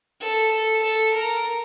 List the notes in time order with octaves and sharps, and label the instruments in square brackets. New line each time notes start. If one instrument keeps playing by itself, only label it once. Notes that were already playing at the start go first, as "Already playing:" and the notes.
[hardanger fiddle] A4
A4
A4
A#4